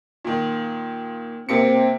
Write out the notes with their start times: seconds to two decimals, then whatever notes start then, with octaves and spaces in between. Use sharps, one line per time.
0.25 A#2 D#3
1.49 C3 A#3 C4 C#7